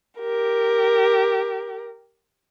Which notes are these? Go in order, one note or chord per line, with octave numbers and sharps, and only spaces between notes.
G4 A#4